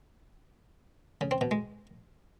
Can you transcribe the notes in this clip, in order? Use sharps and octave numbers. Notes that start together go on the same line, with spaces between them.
C#3
C4
B2
G#3